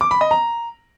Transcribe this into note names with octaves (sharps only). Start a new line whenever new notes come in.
D6
B5
D#5
A#5